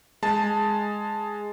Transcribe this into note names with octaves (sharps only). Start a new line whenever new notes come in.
G#3 A5